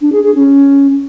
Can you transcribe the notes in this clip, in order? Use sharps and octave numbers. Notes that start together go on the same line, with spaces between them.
D4
G#4
G#4
C#4